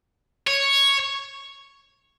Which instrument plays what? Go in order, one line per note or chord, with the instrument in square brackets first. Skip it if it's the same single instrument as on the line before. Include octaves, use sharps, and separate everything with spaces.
[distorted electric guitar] C#5